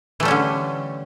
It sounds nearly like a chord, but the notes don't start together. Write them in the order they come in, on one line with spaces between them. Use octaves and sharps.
E3 A3 G3 C#4 D3